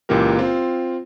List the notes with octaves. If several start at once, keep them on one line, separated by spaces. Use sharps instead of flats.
C#2 A#2 E3 A#3 G4 A#4
C4 F4